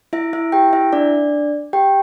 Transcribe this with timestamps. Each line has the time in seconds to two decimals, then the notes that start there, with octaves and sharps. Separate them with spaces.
0.13 E4 E5
0.33 E4 E5
0.52 G4 G5
0.73 E4 E5
0.93 D4 D5
1.73 G4 G5